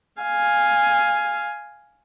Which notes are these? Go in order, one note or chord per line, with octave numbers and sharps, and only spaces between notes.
F5 G#5